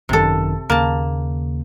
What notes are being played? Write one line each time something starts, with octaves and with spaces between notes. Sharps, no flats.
G#1 F#2 C3 D#3 A4
D#2 C#3 A#3 A5